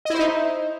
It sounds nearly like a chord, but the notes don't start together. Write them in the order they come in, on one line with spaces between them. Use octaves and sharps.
D#5 E4 C5 D#4